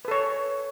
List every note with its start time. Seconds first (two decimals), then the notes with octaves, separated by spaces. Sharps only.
0.05 B4
0.08 A4
0.11 C#5